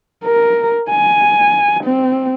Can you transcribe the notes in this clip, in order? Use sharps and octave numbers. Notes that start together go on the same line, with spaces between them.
A#4
G#5
C4